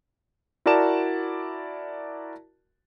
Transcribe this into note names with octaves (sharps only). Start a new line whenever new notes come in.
E4 F#4 A#4 D5 A5 E7